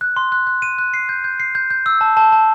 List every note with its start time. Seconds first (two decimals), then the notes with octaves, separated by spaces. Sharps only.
0.01 F#6
0.16 C6
0.32 F#6
0.47 F#6
0.62 D#7
0.79 F#6
0.94 C7
1.09 G6
1.24 G6
1.40 C7
1.55 G6
1.70 G6
1.86 E6
2.01 A5
2.17 A5
2.32 A5